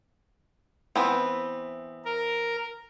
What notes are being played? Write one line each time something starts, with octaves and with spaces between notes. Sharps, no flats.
E3 B3 C4
A#4